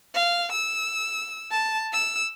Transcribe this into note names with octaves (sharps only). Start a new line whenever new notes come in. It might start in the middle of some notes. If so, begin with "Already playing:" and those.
F5
E6
A5
E6